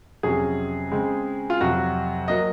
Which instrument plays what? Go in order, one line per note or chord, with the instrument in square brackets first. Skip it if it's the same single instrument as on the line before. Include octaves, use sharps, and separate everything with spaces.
[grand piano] F2 C3 F#3 C#4 G#4
C#3 G#3 C4
F4
F2 C3 F#3 F#4
F#3 A#3 D#5